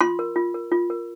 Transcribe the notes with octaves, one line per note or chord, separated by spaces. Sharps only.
F4 C6
A#4
F4
A#4
F4
A#4